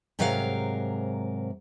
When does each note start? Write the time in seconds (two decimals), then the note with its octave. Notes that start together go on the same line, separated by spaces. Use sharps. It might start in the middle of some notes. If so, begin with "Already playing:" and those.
0.19 G#2 C3 F#3 A#4 F5